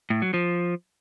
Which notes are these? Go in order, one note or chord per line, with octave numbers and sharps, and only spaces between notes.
A2
F#3
F3